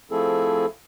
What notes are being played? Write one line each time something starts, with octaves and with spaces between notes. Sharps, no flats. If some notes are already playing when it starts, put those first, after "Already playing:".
F3 A3 C4 E4 G#4 A4